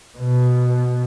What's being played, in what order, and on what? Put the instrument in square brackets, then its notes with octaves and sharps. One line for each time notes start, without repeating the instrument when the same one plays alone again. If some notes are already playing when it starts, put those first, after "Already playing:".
[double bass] B2